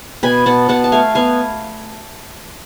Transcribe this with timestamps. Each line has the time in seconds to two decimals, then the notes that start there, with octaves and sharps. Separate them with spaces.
0.23 B2 G#5 B5
0.46 B2 F#5 A5
0.69 B2 F#5 A5
0.84 A5
0.92 A3 F5 G#5
1.15 B3 F5 G#5